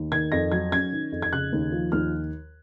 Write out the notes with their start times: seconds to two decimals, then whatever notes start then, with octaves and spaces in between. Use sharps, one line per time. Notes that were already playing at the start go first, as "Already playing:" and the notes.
Already playing: D#2
0.12 D#3 G#6
0.32 F2 A#6
0.52 F#3 G#6
0.72 C#4 G#6
0.92 D#3
1.12 F2
1.22 G#6
1.33 C#3 F#6
1.52 D#2
1.72 F3
1.92 D#2 F6